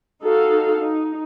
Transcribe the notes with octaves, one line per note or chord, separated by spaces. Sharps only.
D#4 F#4 A4 F5
D#4